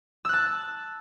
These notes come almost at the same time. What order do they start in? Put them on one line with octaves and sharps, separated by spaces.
E6 F#6 A5